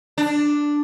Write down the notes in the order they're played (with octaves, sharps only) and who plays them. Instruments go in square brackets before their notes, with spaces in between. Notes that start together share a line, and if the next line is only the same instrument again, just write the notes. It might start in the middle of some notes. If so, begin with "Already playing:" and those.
[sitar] D4